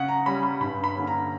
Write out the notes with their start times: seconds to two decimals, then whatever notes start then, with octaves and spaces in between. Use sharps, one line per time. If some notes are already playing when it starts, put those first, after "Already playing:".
Already playing: C#3 F#5
0.09 A#5
0.26 G3 C#4 B5
0.43 B5
0.61 G2 B5
0.84 B5
0.96 D3 A#3 C#4
1.07 A#5